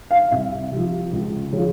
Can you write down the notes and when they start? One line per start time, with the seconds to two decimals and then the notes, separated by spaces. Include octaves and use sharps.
0.11 F5
0.31 C2 E5
0.72 C3 F3
1.12 C#2
1.53 C#3 F3